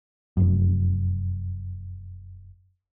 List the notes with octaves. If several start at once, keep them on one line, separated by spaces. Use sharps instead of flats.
F1 F#2